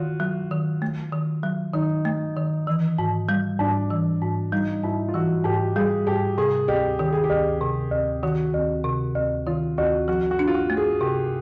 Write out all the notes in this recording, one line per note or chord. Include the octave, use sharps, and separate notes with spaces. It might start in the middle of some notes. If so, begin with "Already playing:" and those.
Already playing: D#3 F4 F#4
F#3
D#3
A3
D#3
F#3
D#3 D#4
A3
D#3
E3
G#2
G3
G#2 D4
E3
G#2
G3 D#4
G#2 E4
F4
E3 F#4
G#2 G4
G3 G#4
G#2 G4
C3 G#4
D2 G4
D#3 G4
G#4
G4
D2
C3
D2
D#3 F#4
D2
C3
D2
D#3 F4
D2 F#4
F3 F#4
F#4
D4
F4
F#4
A3
G#4
C3 G4